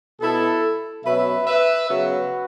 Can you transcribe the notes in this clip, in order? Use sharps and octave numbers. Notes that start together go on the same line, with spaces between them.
B2 B3 E4 A4
B2 F#3 C#4 B4 E5
B4 E5
C#3 F#3 B3 F#4 B4